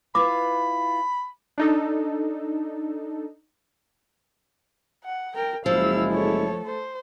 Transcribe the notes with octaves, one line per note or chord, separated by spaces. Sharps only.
E4 F4 B4 B5 D6
D4 D#4 A4
F#5
A#4 G5
F#1 F3 G#3 E4 F5 E6
A3 A4 C#5
C5